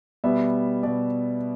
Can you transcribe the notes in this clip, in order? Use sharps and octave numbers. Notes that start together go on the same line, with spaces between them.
B2 G3 B3 E5
B2 G3 B3 D5